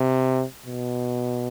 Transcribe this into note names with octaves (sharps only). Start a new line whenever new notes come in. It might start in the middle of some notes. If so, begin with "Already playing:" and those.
Already playing: C3
B2